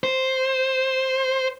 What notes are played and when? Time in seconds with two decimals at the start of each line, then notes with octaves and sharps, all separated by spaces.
0.04 C5